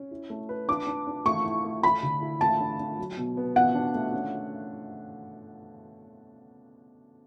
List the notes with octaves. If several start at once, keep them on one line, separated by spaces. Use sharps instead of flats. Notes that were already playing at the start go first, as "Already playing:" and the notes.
Already playing: C#4
E4
A3
B4
D4 D6
D4
D4
A3 C#6
E4
A3
A3 B5
D3
E4
A3 A5
D4
D4
F#3
B2
B3
B2 F#5
D4
A3
C#4